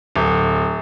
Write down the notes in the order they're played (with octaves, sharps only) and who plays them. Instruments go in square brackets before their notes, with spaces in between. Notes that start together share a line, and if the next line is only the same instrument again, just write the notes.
[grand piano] D1